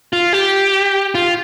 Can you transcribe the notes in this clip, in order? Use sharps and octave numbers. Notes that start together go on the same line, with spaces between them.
F4
G4
F4